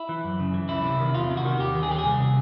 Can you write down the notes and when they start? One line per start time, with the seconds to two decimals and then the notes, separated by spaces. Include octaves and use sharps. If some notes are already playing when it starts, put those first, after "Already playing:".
Already playing: E4
0.09 E3
0.24 F#2
0.40 C#3
0.54 E3
0.69 C#2 E4
0.84 C3
1.00 D#3
1.15 E2 F4
1.30 C3
1.37 F#4
1.45 D#3
1.60 D#2 G4
1.75 D#3
1.83 G#4
1.90 D#2 G4
1.98 G#4
2.05 C2
2.20 C3